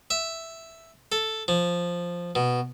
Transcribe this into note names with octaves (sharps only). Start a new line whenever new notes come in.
E5
A4
F3
B2